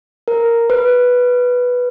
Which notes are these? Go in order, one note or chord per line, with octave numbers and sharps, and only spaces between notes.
A#4
B4